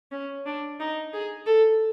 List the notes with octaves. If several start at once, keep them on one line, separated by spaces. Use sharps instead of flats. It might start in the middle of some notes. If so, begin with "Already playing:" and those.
C#4
D4
D#4
G#4
A4